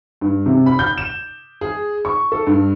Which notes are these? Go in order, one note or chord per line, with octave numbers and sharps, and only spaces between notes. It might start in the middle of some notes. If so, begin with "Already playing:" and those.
G2
C3
B5
G6
E7
G#4
C#6
A4
G2